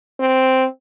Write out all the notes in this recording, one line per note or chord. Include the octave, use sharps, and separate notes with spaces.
C4